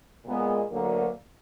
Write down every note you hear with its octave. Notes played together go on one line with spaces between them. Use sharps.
A#2 G#3 B3
D2 D3 F#3 A#3